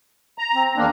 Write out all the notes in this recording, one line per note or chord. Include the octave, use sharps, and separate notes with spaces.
A#5
C4
E2 A#3 D4